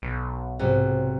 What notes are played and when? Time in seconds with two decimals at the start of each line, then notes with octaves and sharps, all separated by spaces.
0.02 B1
0.59 G#2 C3 F#3